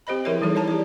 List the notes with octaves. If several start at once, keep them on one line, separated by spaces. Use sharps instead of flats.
C4 G4 C5 D#5 B5
F3 E4 G#4 A#4 C#5 E5
E3 G3 D#4 G#4 A4
E4 C#5 A5 A#5
G4 G#4 D5